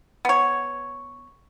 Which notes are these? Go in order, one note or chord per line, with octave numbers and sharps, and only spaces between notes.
B3 C#5